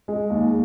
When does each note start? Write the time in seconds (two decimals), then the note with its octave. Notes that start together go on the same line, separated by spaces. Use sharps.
0.08 G#3
0.30 D#2